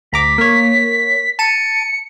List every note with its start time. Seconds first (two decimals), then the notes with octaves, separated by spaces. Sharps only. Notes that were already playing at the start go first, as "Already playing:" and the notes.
0.12 D2 A#5 D6 B6
0.38 A#3 C#5
1.39 A5 C#7 D#7